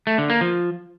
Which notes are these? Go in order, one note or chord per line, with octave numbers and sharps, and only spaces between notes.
A3
D3
A#3
F3